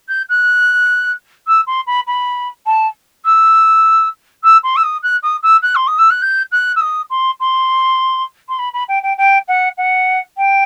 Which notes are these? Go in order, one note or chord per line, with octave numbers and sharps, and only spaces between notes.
G6
F#6
E6
C6
B5
B5
A5
E6
E6
C6
E6
D#6
F#6
D#6
E6
F#6
C6
D#6
E6
F#6
G6
F#6
E6
D#6
C6
C6
C6
B5
B5
G5
G5
G5
F#5
F#5
G5